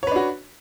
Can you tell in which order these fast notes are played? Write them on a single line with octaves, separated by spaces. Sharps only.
C#5 B4 D4 F#4